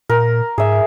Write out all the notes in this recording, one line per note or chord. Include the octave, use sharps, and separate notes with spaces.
A#2 A#4
G#2 G#4 E5